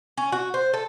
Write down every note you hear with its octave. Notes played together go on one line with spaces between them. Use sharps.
C#4
F#4
C5
A4